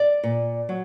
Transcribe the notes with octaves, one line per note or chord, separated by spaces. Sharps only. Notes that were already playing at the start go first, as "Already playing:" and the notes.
Already playing: D5
A#2
F#3